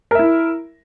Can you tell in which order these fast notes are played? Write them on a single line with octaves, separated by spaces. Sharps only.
A#4 E5 E4